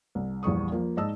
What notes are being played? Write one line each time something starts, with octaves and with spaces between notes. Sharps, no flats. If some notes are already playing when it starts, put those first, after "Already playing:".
C2
A#1 E2 G3 C#6 D#6
F3 A#3
G#2 D5 D#5 A5 E6